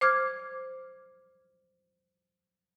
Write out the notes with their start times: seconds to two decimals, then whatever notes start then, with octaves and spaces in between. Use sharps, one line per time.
0.01 C5 D6 F6 G#6